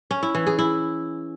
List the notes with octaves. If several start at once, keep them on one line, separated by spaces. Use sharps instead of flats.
C#4
E4
E3
G#4
E4